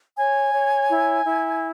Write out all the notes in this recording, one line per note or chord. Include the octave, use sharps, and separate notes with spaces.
C#5 G#5
C#5
E4
E4